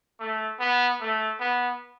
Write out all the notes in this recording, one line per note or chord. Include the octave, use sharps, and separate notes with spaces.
A3
B3
A3
B3